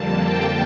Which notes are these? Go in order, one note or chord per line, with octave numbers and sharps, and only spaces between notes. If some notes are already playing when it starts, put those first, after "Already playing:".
Already playing: F2 D3 G3 A#3 A5
G5